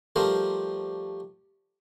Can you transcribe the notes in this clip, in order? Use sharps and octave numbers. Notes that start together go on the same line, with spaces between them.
F3 G3 A3 A#4 C5